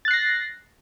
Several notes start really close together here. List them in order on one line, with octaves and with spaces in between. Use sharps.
A6 F#6 C7 A#6